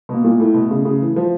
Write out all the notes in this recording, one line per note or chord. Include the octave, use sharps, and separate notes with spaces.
B2
A#3
A#2
A2 A3
B2
C#3
C#3
E3
E3
F3